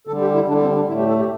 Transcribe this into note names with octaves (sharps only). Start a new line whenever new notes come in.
D3 G3 A4
G4
E4
D3 G3 D4
C4
D4
A2 A3 E4
G4
A4
G4